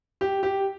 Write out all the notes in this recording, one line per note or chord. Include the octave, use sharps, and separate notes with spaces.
G4
G4